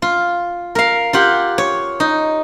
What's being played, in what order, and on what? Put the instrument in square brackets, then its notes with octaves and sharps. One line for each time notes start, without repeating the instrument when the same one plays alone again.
[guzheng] F4
A#4 F5
F4 G4 F#5
C#5
D#4